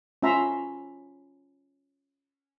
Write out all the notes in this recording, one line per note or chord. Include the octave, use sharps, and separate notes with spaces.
C#4 F4 E5 A#5 C6